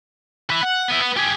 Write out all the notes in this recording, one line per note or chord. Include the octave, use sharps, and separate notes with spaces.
B4 E5
F#5
B3 E4
B3
G4 G#4